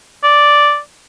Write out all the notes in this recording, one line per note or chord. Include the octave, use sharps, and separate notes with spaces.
D5